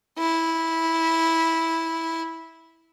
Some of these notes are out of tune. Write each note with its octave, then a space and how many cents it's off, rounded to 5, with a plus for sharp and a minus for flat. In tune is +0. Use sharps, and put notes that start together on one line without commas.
E4 -10